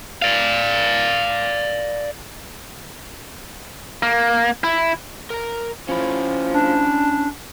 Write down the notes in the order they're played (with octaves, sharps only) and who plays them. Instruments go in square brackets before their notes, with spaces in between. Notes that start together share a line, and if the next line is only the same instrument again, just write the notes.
[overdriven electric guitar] D5 F5
[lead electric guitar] A#3
E4
[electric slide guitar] A#4 A#5
[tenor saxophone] F3 [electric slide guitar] C#4 E4
[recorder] D4